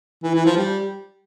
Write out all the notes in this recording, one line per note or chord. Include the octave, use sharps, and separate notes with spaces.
E3
E3
F3
G3